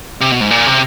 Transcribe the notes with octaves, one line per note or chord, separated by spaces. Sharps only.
C3
B2
G#2
A#2
C3